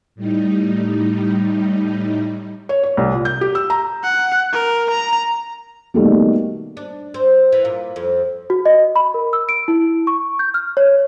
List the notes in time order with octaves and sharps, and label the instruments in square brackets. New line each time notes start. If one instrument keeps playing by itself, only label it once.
[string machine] A2 G3 D#4
[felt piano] C#5
C#5
C2
A#2
G6
G4
E6
A#5
[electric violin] F#5
A#4
A#5
[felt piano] B2 D#3 G3 A3 A#3
[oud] D4
C4
E3
A#2
F2
[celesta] F#4
D#5
B5
A#4
E6
D7
E4
C#6
G6
F6
C#5